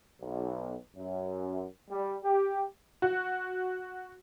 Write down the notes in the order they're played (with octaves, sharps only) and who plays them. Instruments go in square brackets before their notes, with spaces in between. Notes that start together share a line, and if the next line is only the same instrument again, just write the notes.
[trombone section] B1
F#2
G3
G4
[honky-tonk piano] F#4